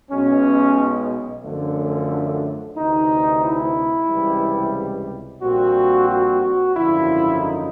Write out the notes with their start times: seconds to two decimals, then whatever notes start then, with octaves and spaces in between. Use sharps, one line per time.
0.10 B1 B2 G#3 C#4
1.43 F#2 D3 F3 A3
2.76 D2 C3 E3 D#4
3.43 E4
4.08 C#2 C3 E3 G3
5.40 A#1 A#2 G3 C4 F#4
6.08 F#4
6.40 F#4
6.74 G#1 F#2 D3 F3 E4
7.39 D#4